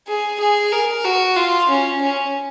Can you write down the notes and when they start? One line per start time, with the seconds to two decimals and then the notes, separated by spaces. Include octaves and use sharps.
0.08 G#4
0.40 G#4
0.72 A#4
1.05 F#4
1.36 F4
1.69 C#4
2.01 C#4